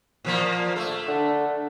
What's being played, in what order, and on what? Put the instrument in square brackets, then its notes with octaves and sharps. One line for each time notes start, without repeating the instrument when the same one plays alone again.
[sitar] A#2 F3 A#3
A3 A4
[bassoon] D3